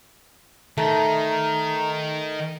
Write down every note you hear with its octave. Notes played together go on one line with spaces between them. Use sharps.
D#3 A3 A#5